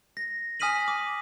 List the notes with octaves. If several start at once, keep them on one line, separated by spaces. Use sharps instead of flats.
A#6
G#5 D#6 F6 B6 D#7 F#7
D6